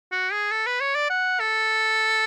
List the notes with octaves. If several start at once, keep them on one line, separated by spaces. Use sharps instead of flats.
F#4
G#4
A4
B4
C#5
D5
F#5
A4